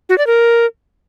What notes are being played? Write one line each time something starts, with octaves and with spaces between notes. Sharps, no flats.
F#4
D5
A#4